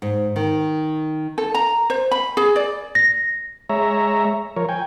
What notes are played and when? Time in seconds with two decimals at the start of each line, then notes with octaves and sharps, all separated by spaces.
0.02 G#2
0.36 D#3
1.38 A4
1.54 A#5
1.90 C5
2.11 B5
2.37 G#4
2.56 D5
2.95 A#6
3.69 G#3 C#5 E5 A#5
4.56 F3 A#4 C#5
4.69 G5 G#5